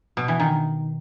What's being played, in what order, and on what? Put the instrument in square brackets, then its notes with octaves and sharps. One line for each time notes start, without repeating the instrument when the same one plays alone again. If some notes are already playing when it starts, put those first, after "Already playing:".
[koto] B2
E3
D#3